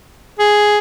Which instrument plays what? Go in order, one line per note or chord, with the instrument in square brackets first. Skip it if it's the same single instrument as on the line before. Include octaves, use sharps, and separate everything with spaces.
[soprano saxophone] G#4